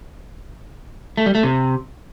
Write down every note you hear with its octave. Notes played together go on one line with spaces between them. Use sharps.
A3
G3
A3
C3